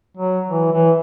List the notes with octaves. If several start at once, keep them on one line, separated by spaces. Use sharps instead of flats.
F#3
E3
E3